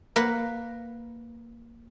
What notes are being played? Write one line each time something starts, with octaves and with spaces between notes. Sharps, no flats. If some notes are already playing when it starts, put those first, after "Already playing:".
A#3 B4 F#5